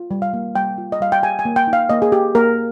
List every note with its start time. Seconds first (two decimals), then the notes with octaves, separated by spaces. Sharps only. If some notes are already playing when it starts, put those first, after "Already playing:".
Already playing: F4
0.11 G3
0.22 F5
0.33 A#3
0.55 G3 G5
0.78 F4
0.92 D#5
1.01 G3 F5
1.12 G5
1.23 G4 G#5
1.39 G#5
1.45 A#3
1.56 G5
1.67 D#4
1.73 F5
1.89 A#3 D#5
2.02 G#4
2.12 G4
2.35 A#3 A#4